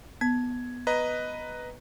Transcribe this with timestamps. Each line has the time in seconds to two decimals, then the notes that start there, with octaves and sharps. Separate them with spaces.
0.21 B3 G#6
0.87 B4 D#5 A#5